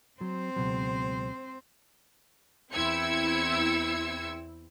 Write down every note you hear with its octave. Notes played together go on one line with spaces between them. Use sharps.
F#3 C4 C5
C#2 B2 F#3
E2 C4 E4 E6 G#6 C#7